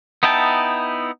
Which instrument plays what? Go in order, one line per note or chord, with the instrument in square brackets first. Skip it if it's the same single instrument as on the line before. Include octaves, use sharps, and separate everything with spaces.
[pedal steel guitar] B3 D#4 E4 G5 A5